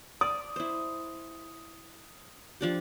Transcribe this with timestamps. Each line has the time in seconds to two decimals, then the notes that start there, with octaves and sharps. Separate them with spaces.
0.21 D5 D#6
0.56 E4 C5
2.61 F3 D4 G4